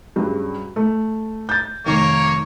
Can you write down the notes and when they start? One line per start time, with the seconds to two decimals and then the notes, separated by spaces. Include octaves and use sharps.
0.16 G2 C#3 F#3
0.76 A3
1.49 G6 A6
1.86 F1 D#3 A#3 C#5